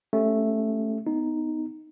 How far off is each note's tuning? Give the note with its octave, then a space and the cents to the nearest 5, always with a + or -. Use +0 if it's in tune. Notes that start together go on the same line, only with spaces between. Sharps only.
A3 +0 C#4 +0 G4 +0
B3 +25 D#4 +0